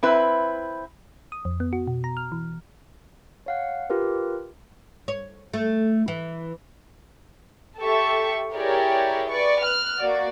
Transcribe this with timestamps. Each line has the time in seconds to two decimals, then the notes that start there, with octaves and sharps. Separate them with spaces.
0.03 C4 E4 B4
1.32 D#6
1.45 F2
1.60 B3
1.73 F#4
1.87 B2
2.04 A#5
2.17 F6
2.32 E3
3.46 C#5 F5 F#5
3.90 F4 G4 A#4 B4
5.08 C#5
5.53 A3
6.08 E3
7.80 G4 A4 E5 C#6
8.53 E4 G4 G#4 A#4 C#5 D5
9.29 B4 D5 C#6
9.61 F6 F#6
9.98 A#3 F#4 D5